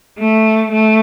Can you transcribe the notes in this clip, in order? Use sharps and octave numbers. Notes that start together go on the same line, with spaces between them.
A3
A3